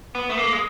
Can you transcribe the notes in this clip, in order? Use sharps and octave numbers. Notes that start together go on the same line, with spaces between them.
B3
A3
A#3
G#3